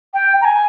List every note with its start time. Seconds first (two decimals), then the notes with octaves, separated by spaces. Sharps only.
0.14 G5
0.41 A#5
0.45 G#5